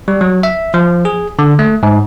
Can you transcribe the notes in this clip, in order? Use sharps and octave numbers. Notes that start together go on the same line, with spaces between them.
G3
F#3
E5
F3
G#4
D3
A3
G#2